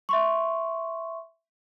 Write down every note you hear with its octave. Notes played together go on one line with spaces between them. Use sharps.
E5 C6 C#6